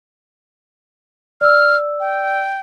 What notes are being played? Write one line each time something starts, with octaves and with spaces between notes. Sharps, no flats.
D5 E6 F6
G5